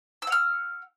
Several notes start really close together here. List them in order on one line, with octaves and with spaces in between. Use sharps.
E6 F#5 F6